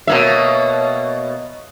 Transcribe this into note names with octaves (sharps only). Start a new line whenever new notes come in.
B2 A#3 C#5 E5